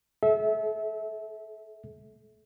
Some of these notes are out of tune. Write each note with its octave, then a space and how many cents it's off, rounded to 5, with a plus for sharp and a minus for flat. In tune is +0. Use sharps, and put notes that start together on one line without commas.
A4 -40 E5 -20